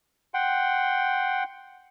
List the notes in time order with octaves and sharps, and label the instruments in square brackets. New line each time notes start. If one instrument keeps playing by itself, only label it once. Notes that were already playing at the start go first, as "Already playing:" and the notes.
[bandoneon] F#5 G5 C6